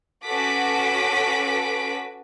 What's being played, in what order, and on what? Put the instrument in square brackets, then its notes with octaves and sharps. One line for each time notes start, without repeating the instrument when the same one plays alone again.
[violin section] C#4 F#4 A4 B4 D6 B6